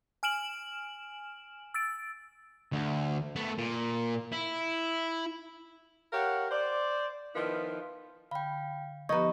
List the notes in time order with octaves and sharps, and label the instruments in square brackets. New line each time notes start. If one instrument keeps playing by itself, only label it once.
[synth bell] G#5 F6 D7 E7 F#7
E6 A6 D7
[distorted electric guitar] D2
A3 B3
A#2
E4
[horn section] G4 A#4 C#5 F5 F#5
C5 D5
D#3 F3 B3 E4 F4
[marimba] D3 B5 [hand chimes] F5 G5
[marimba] F3 B3 G4 [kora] D#4 B4 [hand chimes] A#5 C#6